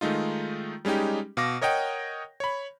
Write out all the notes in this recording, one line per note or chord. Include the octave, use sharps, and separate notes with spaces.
D#3 G#3 A3 D#4 F4
G3 G#3 C#4 D#4 G4
B2 F5 D6 A#6
A#4 C#5 D#5 F#5 G5
C#5 B5